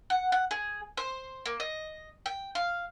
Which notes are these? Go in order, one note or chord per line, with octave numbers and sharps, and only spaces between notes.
F#5
F#5
G#4
C5
A#3
D#5
G5
F5